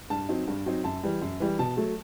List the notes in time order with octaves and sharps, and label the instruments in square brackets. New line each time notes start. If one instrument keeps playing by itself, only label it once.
[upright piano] G2 A5
F#3 C4 D#4
G2
F#3 C4 D#4
F#2 A5
E3 G3
F#2
E3 G3
B2 A5
F#3 A3